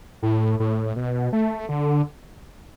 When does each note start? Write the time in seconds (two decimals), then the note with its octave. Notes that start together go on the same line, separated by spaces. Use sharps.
0.23 A2
0.60 A2
0.96 B2
1.33 A3
1.69 D3